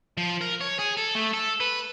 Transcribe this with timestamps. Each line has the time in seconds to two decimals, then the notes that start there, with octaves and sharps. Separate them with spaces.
0.17 F3
0.41 A#4
0.61 C#5
0.79 G#4
0.97 A4
1.15 A3
1.33 A4
1.60 B4